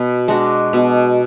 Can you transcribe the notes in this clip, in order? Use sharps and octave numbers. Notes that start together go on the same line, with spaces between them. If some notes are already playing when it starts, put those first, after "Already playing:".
Already playing: B2
G#3 D4 F#4
B2